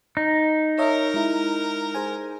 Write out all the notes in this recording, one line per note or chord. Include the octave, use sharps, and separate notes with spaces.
D#4
A#4 C#5 D#5 E5
G#3 E4
G#4 C5 G#5